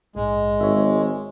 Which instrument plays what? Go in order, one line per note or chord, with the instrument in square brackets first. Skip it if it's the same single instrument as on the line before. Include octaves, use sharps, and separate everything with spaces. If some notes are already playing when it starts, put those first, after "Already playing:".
[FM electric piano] A#1 G#2 [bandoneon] G#3
[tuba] G#1 [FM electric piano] C#5 E5